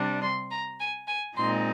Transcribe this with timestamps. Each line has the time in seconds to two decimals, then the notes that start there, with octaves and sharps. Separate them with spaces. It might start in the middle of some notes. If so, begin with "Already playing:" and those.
Already playing: C3 G3 D4
0.22 C6
0.51 A#5
0.79 G#5
1.08 G#5
1.36 A#2 G#3 C4 D#4 C6